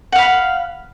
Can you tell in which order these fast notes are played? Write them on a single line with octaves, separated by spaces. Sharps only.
F#5 F5 B5